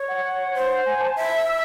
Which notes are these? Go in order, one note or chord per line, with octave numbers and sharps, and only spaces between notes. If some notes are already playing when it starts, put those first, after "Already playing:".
Already playing: C#5
F#5
C5
G#5
A5
E5
E6